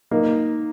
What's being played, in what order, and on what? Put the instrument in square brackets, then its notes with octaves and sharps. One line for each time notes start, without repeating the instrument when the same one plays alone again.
[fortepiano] A#3 [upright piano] D#4